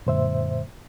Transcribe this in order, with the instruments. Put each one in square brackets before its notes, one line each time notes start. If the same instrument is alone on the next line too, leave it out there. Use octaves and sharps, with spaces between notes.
[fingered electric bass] F#2 D3 G#3 [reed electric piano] A#2 C5 E5